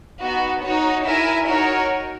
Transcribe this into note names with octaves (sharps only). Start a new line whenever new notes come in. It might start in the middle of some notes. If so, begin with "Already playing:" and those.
B3 D#4 F#4
D#4 F#4 C#5
E4 A#4 E5 G#5
D#4 F#4 A#4 C#5